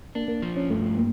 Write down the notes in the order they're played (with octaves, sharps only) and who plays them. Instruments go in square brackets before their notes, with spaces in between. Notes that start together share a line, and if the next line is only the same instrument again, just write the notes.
[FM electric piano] A#3 [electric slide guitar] D4
[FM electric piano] A#3
[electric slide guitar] F3
[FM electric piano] C#4
[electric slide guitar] G2 [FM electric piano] A3
[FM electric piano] A#3